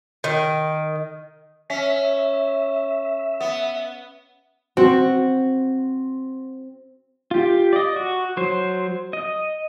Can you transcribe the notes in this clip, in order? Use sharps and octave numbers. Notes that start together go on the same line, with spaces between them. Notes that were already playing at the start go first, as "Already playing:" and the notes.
D#3
C#4 E5
B3
C4 F#4
F4 G4
D5 D#5
F#4
F#3 C5
D#5